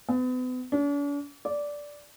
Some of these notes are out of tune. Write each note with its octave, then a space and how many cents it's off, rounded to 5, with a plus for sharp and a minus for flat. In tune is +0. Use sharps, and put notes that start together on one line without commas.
B3 +40
D4 -45
D5 -10